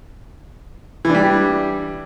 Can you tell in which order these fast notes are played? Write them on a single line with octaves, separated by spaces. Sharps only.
E3 D4 G3